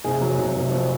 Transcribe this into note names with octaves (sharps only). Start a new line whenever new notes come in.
F1 G#4
F#3
F1
F1
F2